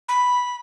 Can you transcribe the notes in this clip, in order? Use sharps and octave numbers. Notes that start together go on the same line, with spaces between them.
B5